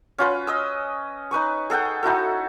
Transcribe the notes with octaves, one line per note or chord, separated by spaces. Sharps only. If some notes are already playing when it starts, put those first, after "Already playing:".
C#4 F4 B4
D#5 D#6 E6
D#4 B4 G#5 C#6
G#4 A4 F#5 G5
D#4 E4 F#4 A4